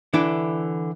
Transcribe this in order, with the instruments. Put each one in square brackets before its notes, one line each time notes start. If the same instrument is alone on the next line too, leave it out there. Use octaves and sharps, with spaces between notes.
[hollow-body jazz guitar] D3 E3 D4 E4